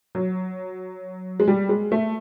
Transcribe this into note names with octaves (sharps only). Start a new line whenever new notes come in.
F#3
G#3
G3
G#3
A3